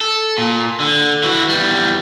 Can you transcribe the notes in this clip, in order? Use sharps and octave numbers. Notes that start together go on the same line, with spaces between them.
A4
A#2
D3
E3 F#4
E2 G3